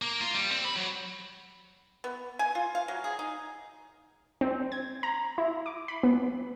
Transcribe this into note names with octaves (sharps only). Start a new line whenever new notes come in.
A#3
F4
G3
C4
B5
F#3
B3
G#5
F4
F5
F#3
G#4
D#4
C4
G#6
A#5
E4
D6
B5
B3